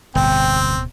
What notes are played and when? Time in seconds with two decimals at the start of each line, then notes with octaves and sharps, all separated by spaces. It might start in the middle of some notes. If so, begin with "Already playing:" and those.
0.15 D1 G1 B2 C4 G5